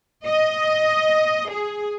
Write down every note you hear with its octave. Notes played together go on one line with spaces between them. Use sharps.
D#5
G#4